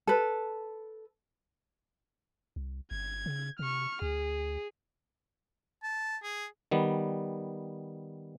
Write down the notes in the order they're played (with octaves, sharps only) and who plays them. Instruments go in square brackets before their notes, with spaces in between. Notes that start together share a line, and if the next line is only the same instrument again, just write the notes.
[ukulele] A4 B4
[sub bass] C2
[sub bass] G1 [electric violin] G#6
[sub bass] C#3
[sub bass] C3 [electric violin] C#6 F6
[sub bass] D2 [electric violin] G#4
[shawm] A5
G#4
[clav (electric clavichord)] D#3 G3 B3